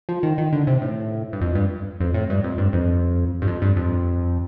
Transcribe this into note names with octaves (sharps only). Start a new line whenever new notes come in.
F3
D#3
D#3
D3
C3
A2
G2
F2
G2
F2
A2
G2
F2
G2
F2
G2
F2
G2
F2